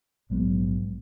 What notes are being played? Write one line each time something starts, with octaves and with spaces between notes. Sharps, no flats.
A#1 G#2 F#3 B3